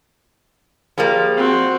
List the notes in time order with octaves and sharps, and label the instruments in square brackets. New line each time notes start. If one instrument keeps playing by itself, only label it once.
[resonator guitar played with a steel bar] F3 G3 A#3 [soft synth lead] G#4
[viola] C4 F#4